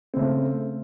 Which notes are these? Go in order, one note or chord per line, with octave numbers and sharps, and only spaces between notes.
C#3 A3 C4